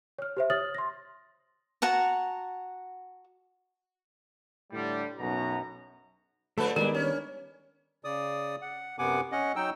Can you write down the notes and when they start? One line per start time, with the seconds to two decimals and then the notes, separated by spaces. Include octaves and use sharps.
0.18 C#5 F6
0.37 G4 C5 E5
0.50 C#5 D#6 F6 A6 F#7
0.75 C6 A#6
1.82 F#4 F#5 A5 A#5
4.72 A2 D3 G3
5.19 B1 F#2 B2 A#5
6.58 D3 F3 A3 A4 B4
6.76 D#3 G3 G#3 B3 D4 A#4
6.94 C#4 C#5
8.04 C#3 D5 D#6
8.62 F#5
8.99 F#2 C3 B3 F#5 G#5 D6
9.32 C#4 D#5 F#5
9.56 F#3 D#4 G5 E6